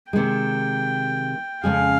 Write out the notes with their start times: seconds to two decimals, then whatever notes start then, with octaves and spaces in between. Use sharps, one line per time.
0.12 C3 D#3 G#3 G5
1.64 F2 C#3 G#3 C#4 G#4 F5